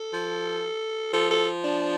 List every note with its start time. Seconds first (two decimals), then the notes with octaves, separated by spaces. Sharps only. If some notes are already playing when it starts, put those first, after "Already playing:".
Already playing: A4
0.13 F3
1.13 F3 A4
1.31 A4
1.64 D4